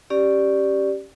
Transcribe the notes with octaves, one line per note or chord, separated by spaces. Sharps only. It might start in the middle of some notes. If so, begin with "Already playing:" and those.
C#4 G4 D5